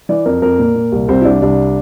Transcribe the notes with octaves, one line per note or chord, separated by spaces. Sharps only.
E3 D5
F2 A#4
F2 A#4
A#2
A#2
C2
C2 C4
E4
C2 D4
C2 D4